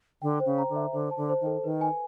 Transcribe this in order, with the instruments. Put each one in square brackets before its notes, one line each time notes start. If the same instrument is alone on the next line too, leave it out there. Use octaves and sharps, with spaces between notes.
[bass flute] D3 [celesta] G5
[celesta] C5
[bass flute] C#3
[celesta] A#5
[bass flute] D3
[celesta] E5
[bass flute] D3 [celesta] C5
[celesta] A5
[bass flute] D3
[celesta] C5
[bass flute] D#3 [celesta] A4
[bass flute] D#3 [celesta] B4
[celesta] G#5